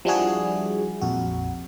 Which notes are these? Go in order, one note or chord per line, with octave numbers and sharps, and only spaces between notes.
F3 G3 D4 E4 F#4 G#4
A#1 F2 F#4